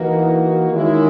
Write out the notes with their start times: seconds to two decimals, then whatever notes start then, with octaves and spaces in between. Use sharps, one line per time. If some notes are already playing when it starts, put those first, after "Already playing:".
Already playing: E3 A#3 D#4 F#4
0.70 D#3 G#3 C#4 E4